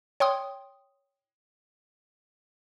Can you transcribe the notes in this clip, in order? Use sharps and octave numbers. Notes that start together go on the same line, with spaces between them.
C#5 G5 C6 D#6